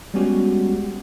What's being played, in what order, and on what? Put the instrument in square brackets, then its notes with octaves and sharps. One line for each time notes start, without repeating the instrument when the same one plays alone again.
[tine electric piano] G3 G#3 B3 C#4 F#4 G4